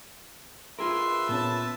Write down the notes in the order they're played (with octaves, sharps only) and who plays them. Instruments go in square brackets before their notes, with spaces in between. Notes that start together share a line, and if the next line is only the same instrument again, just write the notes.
[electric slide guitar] F4 G#4 A#4 [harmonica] B4 E5 [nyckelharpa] C6
[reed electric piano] A#2 B3 C#4 [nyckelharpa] A5